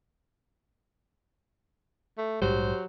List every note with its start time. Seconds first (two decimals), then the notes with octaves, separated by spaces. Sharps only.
2.18 A3
2.42 A#1 G#2 F#3 G3 G4 C5